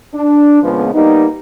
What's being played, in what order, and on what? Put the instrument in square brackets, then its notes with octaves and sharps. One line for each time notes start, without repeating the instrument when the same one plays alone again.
[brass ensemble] D4
C#2 A#2 F3 G#3 B3
G3 A#3 B3 D#4